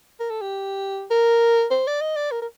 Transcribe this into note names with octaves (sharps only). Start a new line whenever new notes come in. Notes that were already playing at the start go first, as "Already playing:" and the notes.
A#4
A4
G4
A#4
C5
D5
D#5
D5
A#4
A#4